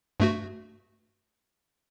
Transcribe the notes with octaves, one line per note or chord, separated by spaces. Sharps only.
G2 A3 F#4